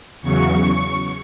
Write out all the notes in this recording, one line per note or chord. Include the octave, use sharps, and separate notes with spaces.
E2 C#3 F#3 C#6